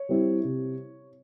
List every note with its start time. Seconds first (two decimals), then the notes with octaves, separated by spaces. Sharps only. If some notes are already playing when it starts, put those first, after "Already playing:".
Already playing: C#5
0.09 G3 C4 E4
0.44 C3